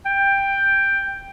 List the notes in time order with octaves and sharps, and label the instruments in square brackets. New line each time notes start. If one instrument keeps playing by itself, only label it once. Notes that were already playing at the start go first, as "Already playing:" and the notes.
[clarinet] G5